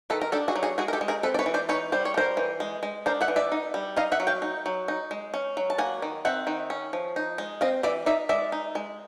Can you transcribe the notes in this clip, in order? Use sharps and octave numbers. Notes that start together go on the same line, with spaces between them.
D#3 A4 B4
A#4
D4 G4 A4
F#4 G#4
F#3
F#4 G#4
G#3 F#4 G#4
A#4
G4 A4
G#3
G#4 A#4
C4 A4 B4
D5
B4 C#5
E3
C5 D5
D#4 B4 C#5
G3 C5
C#5
D4
A#4 C5
E3
G#3
G#3
D4 A#4 C5
E5 F#5
E3
D5 E5
D#4
G3
D#4 D#5 F5
E5 F#5
F#3
F5 G5
D#4
F#3
D#4
G#3
C#4
F#3
A5
A#3 F#5 G#5
D#3
C4 E5 F#5
D#3
C#4
F3
D#4
G#3
C4 D#5 F5
E3 D5 E5
D#4 D5 E5
G#3 D5 E5
D#4
G#3